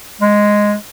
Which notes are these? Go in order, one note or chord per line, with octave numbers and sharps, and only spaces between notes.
G#3